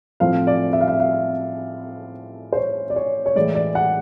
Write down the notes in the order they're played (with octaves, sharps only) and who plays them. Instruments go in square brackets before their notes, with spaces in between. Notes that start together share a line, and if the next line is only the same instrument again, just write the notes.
[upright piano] A2 F3 A3 C4 F5
D5
E5
F5
E5
F5
C5
C#5
D5
C#5
C#5
A2 E3 G#3 D5
D5
F#5